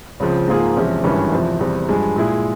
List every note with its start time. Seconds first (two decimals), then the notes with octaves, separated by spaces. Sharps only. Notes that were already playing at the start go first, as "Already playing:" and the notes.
0.20 C#2 C#3 F3 C4
0.48 G#2 F3 A#3 F4 G#4
0.76 E2 C3 F3 G#3 C#4
1.03 G#1 G2 E3 G#3 C#4
1.32 E2 C3 F3
1.60 E2 C3 G3
1.89 G2 F3 G#3
2.16 A#2 G#3 E4 G#4